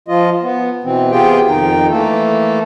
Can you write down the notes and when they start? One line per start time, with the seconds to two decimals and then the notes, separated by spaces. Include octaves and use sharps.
0.08 F3 F4 D#5
0.42 B3
0.84 B2 E3 C4
1.12 C3 B3 F4 G4 G#4 G5
1.48 F2 D#3 D#4 G5
1.90 E3 A3 A#3 A4